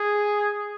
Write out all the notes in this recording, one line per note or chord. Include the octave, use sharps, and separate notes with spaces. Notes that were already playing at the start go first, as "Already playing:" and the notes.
Already playing: G#4